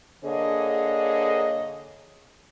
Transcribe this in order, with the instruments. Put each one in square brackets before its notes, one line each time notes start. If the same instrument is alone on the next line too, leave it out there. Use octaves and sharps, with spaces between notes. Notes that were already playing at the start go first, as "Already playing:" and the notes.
[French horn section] D3 A#3 G#4 C#5 D#5